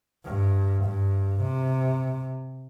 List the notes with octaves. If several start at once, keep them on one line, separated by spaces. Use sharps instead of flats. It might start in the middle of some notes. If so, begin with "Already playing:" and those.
G2
G2
C3